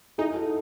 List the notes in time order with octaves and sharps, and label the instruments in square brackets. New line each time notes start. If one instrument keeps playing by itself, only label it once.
[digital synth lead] D#4 [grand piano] E4 G#4
[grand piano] F#4 A4